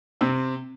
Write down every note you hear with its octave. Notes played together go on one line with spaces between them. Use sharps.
C3 C4